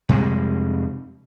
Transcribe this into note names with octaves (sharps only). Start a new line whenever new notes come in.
F2 C3 G3 G#3